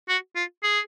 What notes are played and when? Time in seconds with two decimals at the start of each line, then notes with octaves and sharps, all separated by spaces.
0.09 F#4
0.36 F4
0.63 G#4